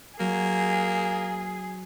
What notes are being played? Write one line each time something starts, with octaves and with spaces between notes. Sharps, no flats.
F#3 A#3 G#4